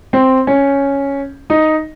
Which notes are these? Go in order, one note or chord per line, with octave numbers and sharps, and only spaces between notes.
C4
C#4
D#4